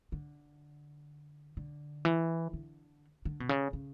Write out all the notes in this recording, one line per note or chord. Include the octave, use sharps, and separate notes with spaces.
D3
D3
E3
D3
D3
B2
C#3
C#3